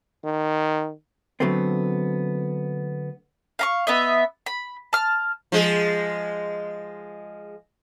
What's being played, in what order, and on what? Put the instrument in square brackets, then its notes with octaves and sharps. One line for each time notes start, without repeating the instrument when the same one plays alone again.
[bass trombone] D#3
[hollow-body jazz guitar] D3 F#3 A3 B3 C4
[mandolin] F5 A#5 C#6
B3 D#5 E5
B5
A5 F6
[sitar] F3 G#3 G#4